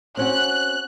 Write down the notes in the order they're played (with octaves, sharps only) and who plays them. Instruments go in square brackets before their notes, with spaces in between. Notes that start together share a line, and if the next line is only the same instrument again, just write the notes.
[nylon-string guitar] C4 C#4 F#4 [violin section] F#6